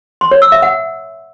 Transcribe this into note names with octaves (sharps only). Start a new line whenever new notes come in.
C6
C#5
E6
E5
F#5